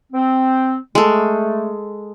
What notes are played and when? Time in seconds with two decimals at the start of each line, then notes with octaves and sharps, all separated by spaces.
0.12 C4
0.95 G#3 A3 A4